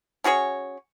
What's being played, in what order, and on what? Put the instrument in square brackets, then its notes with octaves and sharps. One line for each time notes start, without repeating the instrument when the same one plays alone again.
[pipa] C#4 F#4 G#4 C#5